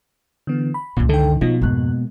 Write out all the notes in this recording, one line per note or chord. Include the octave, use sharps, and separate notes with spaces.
D3 E3 B3
B5
C#2 F#2 A#2
D3 D#3 A4 G5
B2 F3 D#4 F4
F2 G#2 G#3 A#3 F#6